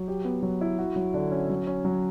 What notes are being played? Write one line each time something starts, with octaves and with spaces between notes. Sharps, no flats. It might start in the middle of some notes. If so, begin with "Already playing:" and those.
Already playing: F#3
G4
B3
F#3
E4
F#4
F#3
D3
C#4
F#3
C#4
F#3